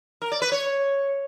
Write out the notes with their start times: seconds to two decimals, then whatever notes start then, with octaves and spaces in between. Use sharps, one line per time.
0.22 A#4
0.32 D5
0.42 B4
0.52 C#5